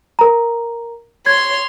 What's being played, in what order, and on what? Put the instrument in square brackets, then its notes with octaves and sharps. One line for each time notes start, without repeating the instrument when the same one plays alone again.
[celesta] A#4 A#5
[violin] C#5 C6 [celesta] G#6